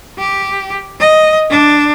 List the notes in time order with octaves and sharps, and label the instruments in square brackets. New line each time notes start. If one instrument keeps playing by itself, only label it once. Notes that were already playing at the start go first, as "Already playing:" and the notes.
[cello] G4
D#5
D4